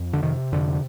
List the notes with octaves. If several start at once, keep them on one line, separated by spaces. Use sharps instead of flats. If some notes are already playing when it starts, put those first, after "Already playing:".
Already playing: F2
D3
C3 D#3
F2 D3